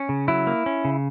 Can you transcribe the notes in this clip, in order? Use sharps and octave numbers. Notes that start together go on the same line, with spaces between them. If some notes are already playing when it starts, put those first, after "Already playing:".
Already playing: C#4
C#3
F#3 E4
A#3
C#4
C#3